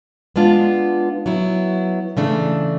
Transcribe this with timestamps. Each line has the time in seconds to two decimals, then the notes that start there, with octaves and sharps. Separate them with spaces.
0.36 G#3 B3 D4 F4
1.26 F#3 B3 E4
2.17 C#3 E3 A3 D4